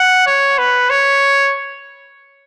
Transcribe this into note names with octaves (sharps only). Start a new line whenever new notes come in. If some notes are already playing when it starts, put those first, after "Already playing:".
Already playing: F#5
C#5
B4
C#5